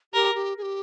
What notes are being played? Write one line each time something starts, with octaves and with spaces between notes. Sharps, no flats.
G4 A#4
G4
G#4
G4